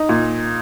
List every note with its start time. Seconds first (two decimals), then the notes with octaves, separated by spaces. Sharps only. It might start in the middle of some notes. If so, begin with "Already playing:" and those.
Already playing: D#4
0.09 A#2